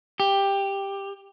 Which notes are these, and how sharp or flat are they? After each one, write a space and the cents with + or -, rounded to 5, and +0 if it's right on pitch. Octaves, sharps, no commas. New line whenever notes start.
G4 +10